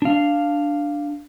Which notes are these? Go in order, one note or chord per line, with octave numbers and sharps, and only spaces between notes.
D4 F5